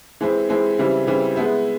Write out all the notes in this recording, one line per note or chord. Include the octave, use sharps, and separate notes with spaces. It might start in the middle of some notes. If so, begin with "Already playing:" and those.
E3 G#3 C4 E4
E3 G#3 C4 E4
C#3 E3 G3 C4 E4
C#3 E3 G3 C4 E4
G#3 B3 E4